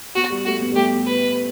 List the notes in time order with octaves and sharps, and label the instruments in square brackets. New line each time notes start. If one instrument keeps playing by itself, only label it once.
[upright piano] B3 [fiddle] F#4
[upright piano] G3
[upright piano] A3 [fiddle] F#4
[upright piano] B3
G3
[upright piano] A3 [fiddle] G4
[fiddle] B4